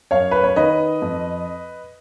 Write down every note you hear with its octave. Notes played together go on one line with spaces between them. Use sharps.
F#2 C#5 F5
B4
C#5
D#3 B4 D#5
F2